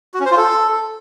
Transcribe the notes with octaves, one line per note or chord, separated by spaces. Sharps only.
F#4
C#4
C5
F4
A4